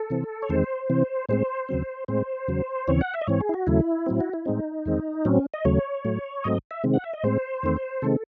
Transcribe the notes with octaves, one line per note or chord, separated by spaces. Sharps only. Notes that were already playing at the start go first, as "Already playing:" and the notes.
Already playing: A4
C3 E3 C4
C#5
E2 D#3 G#3 C4 C5
C3 E3 C4
A2 G#3 C4 C5
D#2 C#3 F#3 C4
A2 G#3 C4 C5
E2 C#3 F#3
D#2 C#3 E3 C4 C#5
F#5
E5
D#5
G#2 E3 C4 C#5
G#4
E4
F#4
D#2 C#3 F#3 A3 E4
A2 F#3 C4
F#4
E4
A2 G#3 C4 D#4
E2 D#3 G#3 C4
A2 F#3 C4 C#4
D#5
D#2 C#3 F#3 A3 C#5
A2 F#3 A3
G#2 F#3 A3 C4 D#5
E5
C3 D#3 G#3 C4
F#5
E5
D#5
A2 G#3 C4 C5
E2 D#3 A3 C4
C3 D#3 G#3 C4 A4